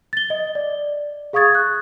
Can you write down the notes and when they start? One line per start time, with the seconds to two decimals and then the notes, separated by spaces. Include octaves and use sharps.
0.13 A6 G7
0.30 D#5
0.55 D5
1.33 G#4 F5 C#6 D#6 G#6 A6
1.55 F#6